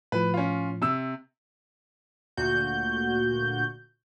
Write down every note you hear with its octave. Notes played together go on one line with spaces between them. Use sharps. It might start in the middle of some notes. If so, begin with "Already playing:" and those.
A2 F3 B4
C#4 F4
C3 E6
D2 A#2 F#4 G6